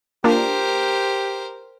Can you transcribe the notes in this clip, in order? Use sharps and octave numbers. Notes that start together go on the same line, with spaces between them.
A#3 D4 F4 G4 A#4 C5